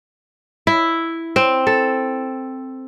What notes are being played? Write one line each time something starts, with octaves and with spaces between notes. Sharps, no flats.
E4
C4
A4